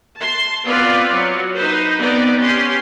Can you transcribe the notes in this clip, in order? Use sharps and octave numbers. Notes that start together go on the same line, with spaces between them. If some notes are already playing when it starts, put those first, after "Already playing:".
A5 C6
B3 C4 F4 B4 D5
F#3
D#4 B4 C5
B3 C4 D#4 D5
C#4 G4 C6